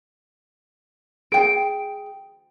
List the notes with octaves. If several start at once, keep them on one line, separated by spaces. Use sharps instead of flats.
G#4 G5 D7